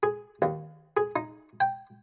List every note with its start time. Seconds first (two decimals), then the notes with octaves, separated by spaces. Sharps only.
0.03 G#4
0.42 D#2
0.97 G#4
1.16 D#4
1.60 G5